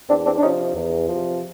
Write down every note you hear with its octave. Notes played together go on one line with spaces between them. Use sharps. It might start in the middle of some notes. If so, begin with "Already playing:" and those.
E2 C4 D4
C4 D4
D4
C3 F3 C#4 D#4
E2
C3 F3